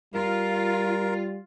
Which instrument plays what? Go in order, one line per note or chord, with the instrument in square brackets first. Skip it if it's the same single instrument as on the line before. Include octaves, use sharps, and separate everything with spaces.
[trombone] G3 [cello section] F4 [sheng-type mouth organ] A#4